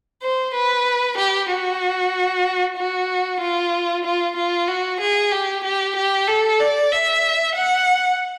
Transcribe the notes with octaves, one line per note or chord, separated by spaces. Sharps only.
C5
B4
G4
F#4
F#4
F4
F4
F4
F#4
G#4
G4
G4
G4
A4
D5
E5
F#5